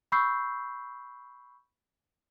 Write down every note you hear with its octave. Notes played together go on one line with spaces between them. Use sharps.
B5 C#6 E6 G6 C7